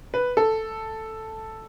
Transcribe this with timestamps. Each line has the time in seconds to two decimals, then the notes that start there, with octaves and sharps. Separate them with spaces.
0.14 B4
0.37 A4